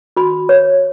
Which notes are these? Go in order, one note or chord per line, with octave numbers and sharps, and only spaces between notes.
F#4 B5
C#5